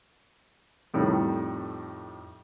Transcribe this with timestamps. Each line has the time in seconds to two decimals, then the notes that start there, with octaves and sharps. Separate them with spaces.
0.94 F2 A2 D#3 G3